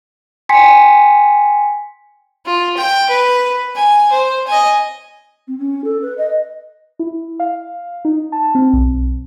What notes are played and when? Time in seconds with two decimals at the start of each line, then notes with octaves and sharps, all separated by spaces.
0.49 G5 G#5 C6 B6 C#7
2.46 F4
2.77 G5
3.09 B4
3.75 G#5
4.11 C5
4.47 D#5 G#5
5.47 C4
5.59 C#4
5.84 A4
6.02 B4
6.18 D#5
6.99 E4
7.40 F5
8.05 D#4
8.32 A5
8.55 C4
8.73 B1